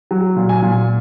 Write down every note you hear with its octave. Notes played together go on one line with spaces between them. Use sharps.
F#3
A#2
G#5
A#2